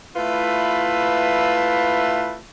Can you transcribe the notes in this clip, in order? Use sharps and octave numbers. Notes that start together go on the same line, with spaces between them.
A3 E4 F4 B4